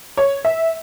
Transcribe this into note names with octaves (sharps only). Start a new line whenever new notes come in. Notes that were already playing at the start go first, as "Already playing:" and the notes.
C#5
E5